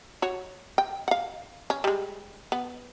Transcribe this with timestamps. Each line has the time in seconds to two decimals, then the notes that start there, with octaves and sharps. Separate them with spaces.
0.22 F#4 C#5
0.78 G5
1.08 F5 F#5
1.70 C#4
1.84 G3 G#3
2.52 B3